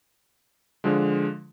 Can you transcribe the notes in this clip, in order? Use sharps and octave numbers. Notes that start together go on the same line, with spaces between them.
D3 F3 G#3